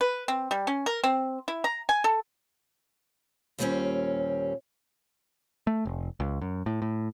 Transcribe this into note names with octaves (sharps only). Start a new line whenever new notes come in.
B4
C4
G3
C#4
A#4
C4
E4
A#5
G#5
A4
D#2 A#2 G3 A3 C4 C#4
A3
F1
C#2
F#2
A2
A2